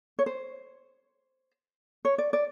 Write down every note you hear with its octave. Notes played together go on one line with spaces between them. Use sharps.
C#5
C5
C#5
D5
D5